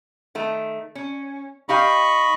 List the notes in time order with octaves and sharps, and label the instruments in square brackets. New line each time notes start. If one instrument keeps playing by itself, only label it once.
[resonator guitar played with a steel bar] D#3 A3
C#4
[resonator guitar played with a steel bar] D#4 G4 F5 [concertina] D#5 B5 C#6